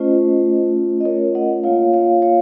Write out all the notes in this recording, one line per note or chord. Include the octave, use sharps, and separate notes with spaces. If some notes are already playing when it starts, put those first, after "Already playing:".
Already playing: A3 C#4 F4 C5 D#5
D#5
A#4 C#5
D#5 F#5
A#3 F4 C#5 F5
C#5 F5
C#5 F5